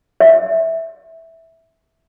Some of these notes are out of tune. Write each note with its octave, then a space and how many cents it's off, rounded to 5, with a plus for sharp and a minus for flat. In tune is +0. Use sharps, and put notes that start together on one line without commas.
E5 -10